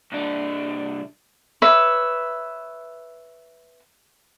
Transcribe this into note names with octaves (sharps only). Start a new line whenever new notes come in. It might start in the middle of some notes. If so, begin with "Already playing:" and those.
C2 D4
B4 C#5 E5